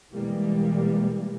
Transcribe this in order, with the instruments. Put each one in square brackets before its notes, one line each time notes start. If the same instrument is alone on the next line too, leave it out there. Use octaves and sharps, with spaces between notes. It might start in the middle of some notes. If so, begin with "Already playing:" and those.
[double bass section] B2 E3 G3 G#3 A#3